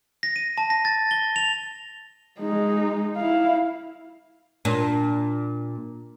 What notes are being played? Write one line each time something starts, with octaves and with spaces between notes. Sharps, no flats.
A#6
D#7
A5
A#6
A6
G7
F7
G#3 D#4
E4 F5
A#2 D4